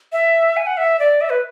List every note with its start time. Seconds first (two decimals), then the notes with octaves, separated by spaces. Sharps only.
0.12 E5
0.57 G#5
0.67 F#5
0.77 E5
0.99 D5
1.21 E5
1.30 B4